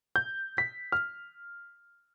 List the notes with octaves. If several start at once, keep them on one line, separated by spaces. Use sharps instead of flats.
G6
B6
F6